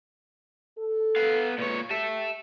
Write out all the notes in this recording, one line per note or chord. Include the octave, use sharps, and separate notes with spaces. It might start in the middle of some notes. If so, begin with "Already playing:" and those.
A4
B3 F5
A#2 G#3 F4 B4 C#5
G4 E5 A5